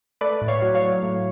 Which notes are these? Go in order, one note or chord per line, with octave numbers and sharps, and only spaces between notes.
A3 B4 D5
A2
C#5 F5
F#3
C#5 F5
F#3
A2